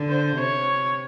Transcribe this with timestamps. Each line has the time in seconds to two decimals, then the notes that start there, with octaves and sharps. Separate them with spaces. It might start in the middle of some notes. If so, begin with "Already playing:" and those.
Already playing: D3
0.09 C5
0.37 C3 C#5